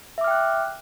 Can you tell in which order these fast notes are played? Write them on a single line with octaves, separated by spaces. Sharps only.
E5 D6 F6 G5 F#6